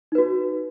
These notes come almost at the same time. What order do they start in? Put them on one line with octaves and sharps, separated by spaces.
D#4 B4 F#4